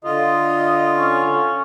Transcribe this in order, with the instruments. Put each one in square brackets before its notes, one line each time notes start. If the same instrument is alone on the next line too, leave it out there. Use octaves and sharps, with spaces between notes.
[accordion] D3 F4 [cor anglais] D#5
[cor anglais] C#4